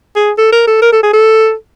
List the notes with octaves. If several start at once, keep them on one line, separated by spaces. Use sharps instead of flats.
G#4
A4
A#4
A4
A#4
A4
G#4
A4